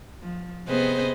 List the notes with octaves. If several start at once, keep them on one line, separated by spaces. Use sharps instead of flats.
F3
C3 B3 G#4 B4 C5 D#5